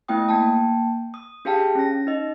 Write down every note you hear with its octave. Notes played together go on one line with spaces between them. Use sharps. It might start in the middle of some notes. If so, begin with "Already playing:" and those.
A3 B3 E4 G5 D#6
A#3 G5 A5
D#6
D4 G4 G#4 F5 G5 A5
C#4 A#6
D#4 D#5